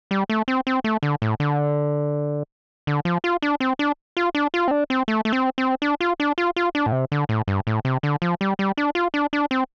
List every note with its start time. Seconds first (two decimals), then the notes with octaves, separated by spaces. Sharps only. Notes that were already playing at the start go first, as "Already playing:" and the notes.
0.11 G3
0.30 A3
0.48 C4
0.67 C4
0.84 A3
1.03 D3
1.22 A2
1.40 D3
2.87 D3
3.05 F3
3.24 F4
3.42 D4
3.60 C4
3.79 D4
4.17 F4
4.35 D4
4.54 F4
4.68 C4
4.71 D4
4.90 C4
5.08 A3
5.25 A3
5.33 C4
5.58 C4
5.82 D4
6.01 F4
6.20 D4
6.38 F4
6.56 F4
6.75 D4
6.86 A2
6.92 C3
7.12 D3
7.29 A2
7.48 G2
7.67 A2
7.85 C3
8.03 D3
8.22 F3
8.41 G3
8.59 G3
8.77 D4
8.95 F4
9.14 D4
9.33 D4
9.51 C4